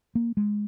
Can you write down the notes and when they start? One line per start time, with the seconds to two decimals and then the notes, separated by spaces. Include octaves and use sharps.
0.15 A#3
0.37 G#3